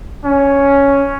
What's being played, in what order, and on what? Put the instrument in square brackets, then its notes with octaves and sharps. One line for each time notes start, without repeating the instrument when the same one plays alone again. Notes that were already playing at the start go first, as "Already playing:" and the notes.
[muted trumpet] C#4